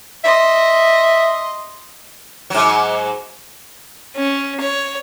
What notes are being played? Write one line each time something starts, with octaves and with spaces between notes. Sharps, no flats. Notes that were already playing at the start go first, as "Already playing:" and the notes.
D#5 E5 C6
G#2 F#3
C#4
C#5